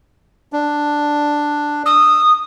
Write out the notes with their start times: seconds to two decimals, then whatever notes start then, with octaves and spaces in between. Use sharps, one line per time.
0.53 D4
1.86 D#6 E6